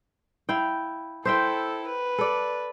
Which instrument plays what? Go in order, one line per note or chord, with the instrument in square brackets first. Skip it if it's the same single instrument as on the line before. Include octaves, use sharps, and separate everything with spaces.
[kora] E4 F5 G5
[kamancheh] E4 A4 [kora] C5 E5 G5
[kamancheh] B4
[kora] A4 D5